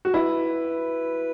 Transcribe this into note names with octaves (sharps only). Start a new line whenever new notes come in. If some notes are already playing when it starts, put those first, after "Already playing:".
F#4
E4 B4